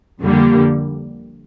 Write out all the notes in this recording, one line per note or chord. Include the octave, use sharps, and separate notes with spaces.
F2 D3 G3 A#3